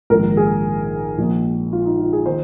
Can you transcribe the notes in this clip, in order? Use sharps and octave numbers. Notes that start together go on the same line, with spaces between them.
A#1 G#2 D#3 A#4
G#4
A#1 A#2
F4
D#4
F4
G#4
D#3 C5